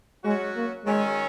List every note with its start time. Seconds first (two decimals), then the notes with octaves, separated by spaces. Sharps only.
0.25 F#3 G#3 C#4 F#4
0.56 A#3
0.85 D#3 F#3 G#3 C#4